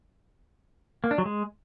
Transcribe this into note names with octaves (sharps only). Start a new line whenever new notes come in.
A#3
D4
F#3
G#3